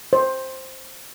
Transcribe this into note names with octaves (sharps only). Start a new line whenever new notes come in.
C5